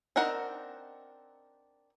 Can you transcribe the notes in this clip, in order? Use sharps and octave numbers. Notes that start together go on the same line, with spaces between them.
C4 D4 D#4 A#4 F#5